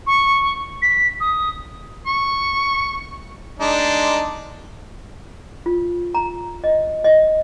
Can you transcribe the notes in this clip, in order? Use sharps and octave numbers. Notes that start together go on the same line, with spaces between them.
C#6
B6
D#6
C#6
G#3 D4 D#4
F4
A#5
D#5
D#5